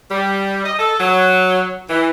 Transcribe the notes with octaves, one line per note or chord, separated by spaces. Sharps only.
G3
D#5
A4
F#3
E3